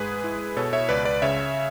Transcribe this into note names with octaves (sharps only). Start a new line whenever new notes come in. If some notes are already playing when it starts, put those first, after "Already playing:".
Already playing: G#2 G#3 G#4 B4
E4
B2 A4 C#5
C#5 E5
C#2 B4 D5
B4 D5
C#3 C#5 E5